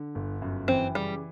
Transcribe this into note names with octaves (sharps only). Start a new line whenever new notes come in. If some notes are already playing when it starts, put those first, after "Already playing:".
Already playing: D3
G1
F#2
E3 C4
C#3 G3